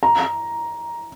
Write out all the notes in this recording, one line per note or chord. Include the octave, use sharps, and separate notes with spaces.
A#5